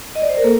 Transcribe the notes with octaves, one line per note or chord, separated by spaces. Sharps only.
D#5
D5
C5
A#4
A#3 A4